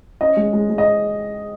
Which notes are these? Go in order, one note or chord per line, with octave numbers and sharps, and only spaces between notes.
C#4 D#5
G#3
G#3
G#3
D#5